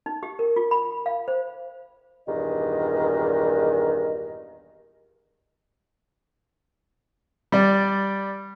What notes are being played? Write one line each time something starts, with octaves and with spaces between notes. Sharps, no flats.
D#4
G4
A#4
F4
B5
F5
C5
E2 G2 A#2 D#3 D#5
G3 D5